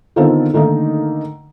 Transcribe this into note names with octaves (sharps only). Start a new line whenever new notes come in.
D3 D#3 B3 C4 F4 A4
D3 D#3 A3 A#3 D#4